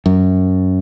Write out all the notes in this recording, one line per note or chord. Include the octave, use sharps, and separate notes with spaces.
F#2